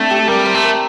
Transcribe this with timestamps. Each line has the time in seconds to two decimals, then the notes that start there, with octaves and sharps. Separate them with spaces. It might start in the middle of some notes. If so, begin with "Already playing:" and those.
Already playing: A3 C4 D4 E4
0.11 G4
0.28 G3 A#4
0.45 C5
0.54 A3
0.63 A#4